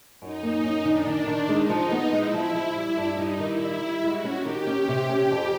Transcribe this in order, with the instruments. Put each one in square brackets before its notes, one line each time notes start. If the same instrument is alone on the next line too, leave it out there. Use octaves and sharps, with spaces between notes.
[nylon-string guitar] F#2 [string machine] D#4
[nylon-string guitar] A#3
F#2
[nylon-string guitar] D#3 [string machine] D4
[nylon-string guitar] D#3
D#3
[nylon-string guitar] G#3 [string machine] D#4
[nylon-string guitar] F3
B3
[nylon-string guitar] G#3 [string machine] E4
[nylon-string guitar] F3
F3
[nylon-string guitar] G3 [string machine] E4
[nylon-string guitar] G2
[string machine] D#4
[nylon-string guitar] G3
[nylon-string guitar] D#3 [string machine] E4
[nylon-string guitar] G3
G3
[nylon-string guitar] G#3 [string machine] F#4
[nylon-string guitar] C#4
[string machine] G4
[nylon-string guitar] D#3
C#4
C3
C#4
F2